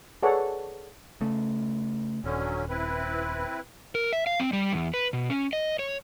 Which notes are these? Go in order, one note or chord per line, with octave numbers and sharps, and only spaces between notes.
G#4 A4 B4 C#5 D5 F#5
C#3 A3
D#1 D3 F#3 C#4
C4 E4 B4
A#4
E5
F5
C4
G3
E2
B4
B2
C#4
D#5
C#5